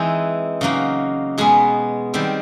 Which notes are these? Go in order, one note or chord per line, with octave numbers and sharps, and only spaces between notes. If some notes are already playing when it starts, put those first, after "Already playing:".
Already playing: E3 G#3 C4 D#4
C#3 F#3 A#3 D#4
B2 G#3 B3 G#4
D#3 G3 C4